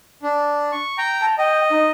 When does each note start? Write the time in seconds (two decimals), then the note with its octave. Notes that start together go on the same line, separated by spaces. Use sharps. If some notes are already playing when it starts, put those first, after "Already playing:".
0.23 D4
0.72 C#6
0.98 G5 A#5
1.21 A5
1.38 D#5 G5
1.70 D#4